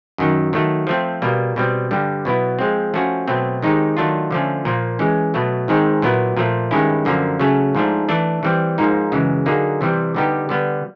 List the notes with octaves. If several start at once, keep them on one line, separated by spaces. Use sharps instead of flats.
F#2 D#3 F#3
D#3 F#3 A3
F3 A3 C4
B2 G3 A#3
B2 G3 C4
G2 D3 G3
B2 F#3 B3 E4
F3 G#3 C4
F3 A3 C#4 F#4
B2 F#3 A3 C4
D#3 G#3 C4 D#4 G4
D#3 F#3 A3 D4 F4
D3 F3 A3 C#4
A#2 F3 A#3
E3 G#3 C#4
B2 F#3 A3
G#2 D#3 G#3 C4
A#2 F#3 B3 E4
A#2 F3 A3
G2 D#3 G#3 C#4 E4
F#2 D3 F3 A#3
C#3 F#3 A3 C#4
G#2 F3 A3 D4
E3 A3 D4
E3 G3 C4
G#2 F3 A#3 D#4
F#2 C#3 E3 G#3
D3 F#3 A#3 D#4 G#4
C3 E3 G3 C4
D3 G3 B3 D#4 G4
D3 G3 B3